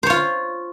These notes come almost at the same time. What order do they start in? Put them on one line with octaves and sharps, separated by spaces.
C5 C#5 F4